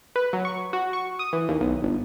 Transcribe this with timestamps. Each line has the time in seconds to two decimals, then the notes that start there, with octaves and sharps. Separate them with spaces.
0.16 B4
0.33 F#3
0.45 C#6
0.73 F#4
0.93 C#6
1.19 D#6
1.33 E3
1.49 D#2
1.61 B1
1.82 G1